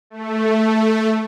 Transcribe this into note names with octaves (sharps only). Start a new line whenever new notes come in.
A3